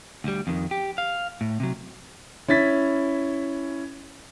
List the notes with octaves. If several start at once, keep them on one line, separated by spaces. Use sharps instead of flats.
D2 G3
F2 D#3
G4
F5
A2
C3 F#3
C#4 E4 A6 B6